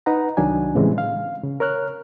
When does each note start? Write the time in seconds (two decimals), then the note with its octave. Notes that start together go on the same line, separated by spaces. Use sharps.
0.06 D#4 B4 F#5 A#5
0.37 C2 D#3 F#3 D4 G#5
0.75 A2 C#3 E3 G3 G#3 C4
0.98 F5
1.44 C#3
1.60 A#4 C#5 F6 F#6